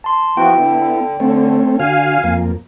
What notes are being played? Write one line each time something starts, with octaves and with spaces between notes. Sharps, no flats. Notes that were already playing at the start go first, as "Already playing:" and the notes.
A5 C6
F3 B3 E4 F#4 G5
D3
D3 A3 C4 C#4
D3 F#4 F5 G#5 F6
F2 A#3